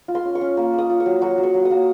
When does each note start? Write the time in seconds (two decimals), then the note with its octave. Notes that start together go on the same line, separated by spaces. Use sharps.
0.08 F4
0.15 C6
0.25 C#4
0.35 C#6
0.41 C#4
0.57 A#3
0.73 A#3
0.78 D#6
0.89 F4
1.00 C#6
1.06 F#3
1.22 F#3 C#6
1.38 F#3
1.43 C#6
1.54 F#3
1.65 D#6
1.70 A#3